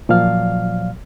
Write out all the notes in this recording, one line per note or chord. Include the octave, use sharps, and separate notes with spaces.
A#2 F3 F#3 D5 F5 F6